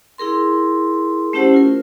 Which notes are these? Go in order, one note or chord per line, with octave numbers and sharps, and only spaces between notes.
E4 G#4 A#4 C6
A3 C#4 E4 G4 C5 F#5
F4 A#4